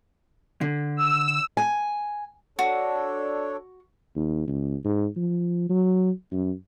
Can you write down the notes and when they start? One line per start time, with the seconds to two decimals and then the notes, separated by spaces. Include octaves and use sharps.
0.61 D3
0.97 E6
1.57 G#5
2.59 D4 F#4 A4 C#5
4.16 D#2
4.47 C#2
4.85 G#2
5.16 F3
5.70 F#3
6.32 F#2